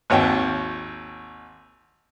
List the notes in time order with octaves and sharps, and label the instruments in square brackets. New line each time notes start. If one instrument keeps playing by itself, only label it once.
[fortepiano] G#1 D#2 C#5 G5